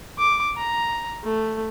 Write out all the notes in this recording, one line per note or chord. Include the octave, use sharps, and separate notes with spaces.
D6
A#5
A3